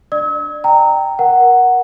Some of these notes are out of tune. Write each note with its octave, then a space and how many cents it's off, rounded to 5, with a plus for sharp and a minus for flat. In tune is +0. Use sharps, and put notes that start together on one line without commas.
D4 +0 D5 +35 E6 -45
G5 -5 A#5 -15
A#4 +20 F#5 +0